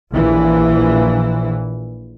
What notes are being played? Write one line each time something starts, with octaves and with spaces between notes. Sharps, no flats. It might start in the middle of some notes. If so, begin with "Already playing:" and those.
A#1 E3